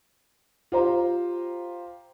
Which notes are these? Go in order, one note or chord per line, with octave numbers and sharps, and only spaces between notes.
F4 G4 C5 A#5